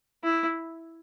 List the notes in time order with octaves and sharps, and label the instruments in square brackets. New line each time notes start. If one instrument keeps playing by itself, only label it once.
[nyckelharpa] E4